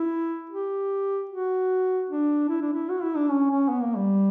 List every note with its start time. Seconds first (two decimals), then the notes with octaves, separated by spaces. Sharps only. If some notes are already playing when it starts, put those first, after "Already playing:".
Already playing: E4
0.50 G4
1.29 F#4
2.10 D4
2.49 E4
2.62 D4
2.73 E4
2.89 F#4
3.02 E4
3.16 D4
3.30 C#4
3.50 C#4
3.69 B3
3.82 A#3
3.96 G3